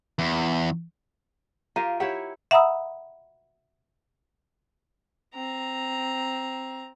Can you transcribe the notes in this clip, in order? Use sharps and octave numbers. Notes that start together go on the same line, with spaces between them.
E2
F4 G4 A#4 F5 A#5 D#7
E4 G4 C#5 E5 F#5
E5 F#5 A#5 B5 D#6 E6
C4 A#5